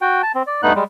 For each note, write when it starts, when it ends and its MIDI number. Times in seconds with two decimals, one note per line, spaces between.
0.02 0.22 66
0.02 0.22 79
0.23 0.32 81
0.35 0.43 60
0.47 0.61 74
0.63 0.73 43
0.63 0.73 57
0.63 0.73 59
0.63 0.73 63
0.63 0.73 90
0.75 0.84 55
0.75 0.84 56